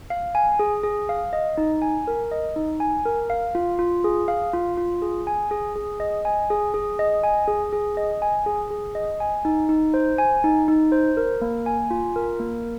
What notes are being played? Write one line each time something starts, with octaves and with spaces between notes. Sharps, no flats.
F5
G#5
G#4
G#4
F5
D#5
D#4
G#5
A#4
D#5
D#4
G#5
A#4
F5
F4
F4
G#4
F5
F4
F4
G#4
G#5
G#4
G#4
D#5
G#5
G#4
G#4
D#5
G#5
G#4
G#4
D#5
G#5
G#4
G#4
D#5
G#5
D#4
D#4
C5
G#5
D#4
D#4
C5
A#4
A#3
G#5
F4
A#4
A#3